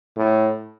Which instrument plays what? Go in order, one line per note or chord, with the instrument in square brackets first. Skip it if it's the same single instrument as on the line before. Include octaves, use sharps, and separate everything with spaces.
[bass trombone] A2